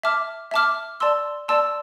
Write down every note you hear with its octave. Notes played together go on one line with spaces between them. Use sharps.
E5 A5 D6 F6
E5 A5 D6 F6
D5 A5 C6 E6
D5 A5 C6 E6